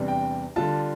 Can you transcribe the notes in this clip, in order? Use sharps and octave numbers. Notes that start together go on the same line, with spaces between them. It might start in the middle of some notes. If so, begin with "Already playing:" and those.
Already playing: E2 C3 G3 D4
G5
D3 G3 D4 F4 A5